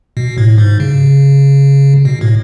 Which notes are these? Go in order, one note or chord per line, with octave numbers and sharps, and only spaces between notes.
B2
A2
G#2
C#3
B2
A2